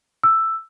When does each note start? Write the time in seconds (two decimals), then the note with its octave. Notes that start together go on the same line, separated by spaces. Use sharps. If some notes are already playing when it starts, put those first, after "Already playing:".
0.24 E6